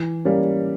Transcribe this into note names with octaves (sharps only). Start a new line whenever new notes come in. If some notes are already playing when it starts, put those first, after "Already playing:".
Already playing: E3
G3 A#3 C#4